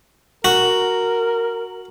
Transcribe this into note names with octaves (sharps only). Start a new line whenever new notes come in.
F#4 A#4